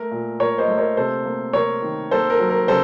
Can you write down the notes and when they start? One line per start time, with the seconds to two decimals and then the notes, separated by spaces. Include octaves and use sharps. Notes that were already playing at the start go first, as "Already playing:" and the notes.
Already playing: A3 A#4
0.11 A#2
0.40 A#2 A#4 C#5
0.58 C5 D#5
0.68 A3
0.78 A#4 C#5
0.97 C3 A4 C5
1.25 A#3
1.53 C3 A#4 C#5
1.82 D#3
2.11 A#3 A4 C5
2.30 A#4
2.39 F#3
2.50 A#4
2.68 C#3 A4 C5